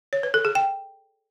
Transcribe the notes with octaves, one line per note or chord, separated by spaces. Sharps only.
C#5
B4
A4
G#4
G5